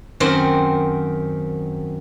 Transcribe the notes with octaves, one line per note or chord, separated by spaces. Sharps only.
F#2 D#3 C4 F#4 C5